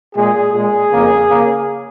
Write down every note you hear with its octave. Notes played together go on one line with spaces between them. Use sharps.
A#2 G#3 G#4
A#2 G#3 G#4
F2 C#3 A#3
C#3 A#3